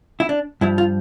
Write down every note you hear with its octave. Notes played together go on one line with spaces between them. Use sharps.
E4
D4
G2 F3 E4
F4